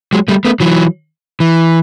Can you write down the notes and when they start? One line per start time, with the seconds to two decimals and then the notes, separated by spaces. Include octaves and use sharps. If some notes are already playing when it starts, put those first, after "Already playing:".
0.13 F#3 G#3
0.28 G3 A3
0.45 A3 B3
0.60 E3 F#3
1.40 E3